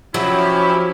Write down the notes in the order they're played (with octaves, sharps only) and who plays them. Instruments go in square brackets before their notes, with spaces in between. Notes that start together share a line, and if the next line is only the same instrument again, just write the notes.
[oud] F3 [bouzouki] F#3 [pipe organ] C#4 G4 [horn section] E4